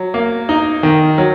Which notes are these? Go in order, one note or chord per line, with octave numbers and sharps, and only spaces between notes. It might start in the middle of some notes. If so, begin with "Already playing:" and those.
Already playing: F#3
A#3
D#4
D#3
F#3